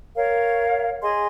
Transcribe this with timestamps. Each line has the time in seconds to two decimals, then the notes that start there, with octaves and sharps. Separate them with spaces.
0.17 A#4 C#5 F5
1.02 G#4 D#5 G#5 C6